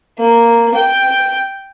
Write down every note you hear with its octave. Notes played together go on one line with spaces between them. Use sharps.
A#3
G5